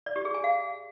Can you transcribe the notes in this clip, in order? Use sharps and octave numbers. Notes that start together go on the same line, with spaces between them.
D5
G4
G#4
G#5
F5